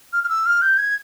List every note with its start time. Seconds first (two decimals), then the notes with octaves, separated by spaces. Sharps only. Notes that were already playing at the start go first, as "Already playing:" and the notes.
0.13 F6
0.24 F6
0.29 E6
0.46 F6
0.62 G6
0.78 G#6